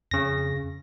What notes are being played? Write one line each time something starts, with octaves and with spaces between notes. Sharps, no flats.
F2 C#3 A#6